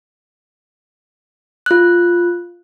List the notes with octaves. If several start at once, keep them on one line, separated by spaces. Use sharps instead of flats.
F4 F#6